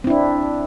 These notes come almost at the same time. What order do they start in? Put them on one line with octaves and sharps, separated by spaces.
C4 E4 D4